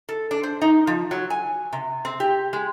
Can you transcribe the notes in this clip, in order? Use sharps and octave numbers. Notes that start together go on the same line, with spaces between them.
A4
D4
C5
D#4
F3
F#3
G#5
C3
C4
G4
G#3